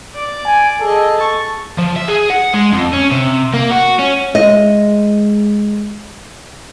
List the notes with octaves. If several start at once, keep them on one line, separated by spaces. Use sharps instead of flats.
D5 D6
G#5
G#4 A4 D#5
A5 C#6
F3
E5
G#4
F#5
G#3
F2
C#4
C3
A#3
F#4
C#4
G#3 D#5